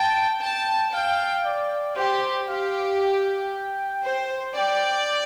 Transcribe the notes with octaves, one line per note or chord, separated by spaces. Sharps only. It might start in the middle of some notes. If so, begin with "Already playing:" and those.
Already playing: G5 A5
G5 A5
F5 G5
D5
G4 C5
G4 F5
G5
C5
D5 G5